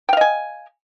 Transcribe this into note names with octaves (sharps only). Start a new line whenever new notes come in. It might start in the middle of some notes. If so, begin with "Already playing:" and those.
D#5 F5 G5 G#5